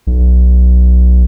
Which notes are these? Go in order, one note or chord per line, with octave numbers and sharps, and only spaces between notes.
B1